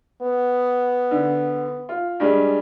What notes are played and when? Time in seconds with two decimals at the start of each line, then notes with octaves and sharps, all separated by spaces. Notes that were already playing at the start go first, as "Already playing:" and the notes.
0.21 B3
1.11 D3
1.89 F4
2.20 G2 G3 G#3